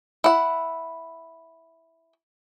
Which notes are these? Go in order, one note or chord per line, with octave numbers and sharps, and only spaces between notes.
E4 F#5